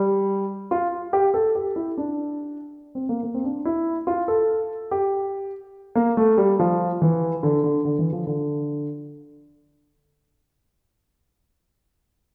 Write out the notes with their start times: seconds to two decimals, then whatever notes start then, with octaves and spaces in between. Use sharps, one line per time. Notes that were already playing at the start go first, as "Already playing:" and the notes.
Already playing: G3
0.71 F4
1.13 G4
1.34 A4
1.55 G4
1.76 E4
1.98 D4
2.95 C4
3.09 A#3
3.23 A#3
3.34 C4
3.44 D4
3.65 E4
4.07 F4
4.28 A4
4.91 G4
5.95 A#3
6.17 A3
6.37 G3
6.59 F3
7.02 E3
7.43 D3
7.64 D3
7.85 D3
7.99 E3
8.13 F3
8.27 D3